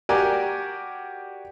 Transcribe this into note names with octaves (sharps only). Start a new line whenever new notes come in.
F#4 G4 A#4 D5 G#5